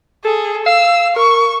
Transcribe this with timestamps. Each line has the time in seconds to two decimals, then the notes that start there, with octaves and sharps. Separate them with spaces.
0.25 G#4 A4
0.66 F5 E6
1.16 A#4 C#6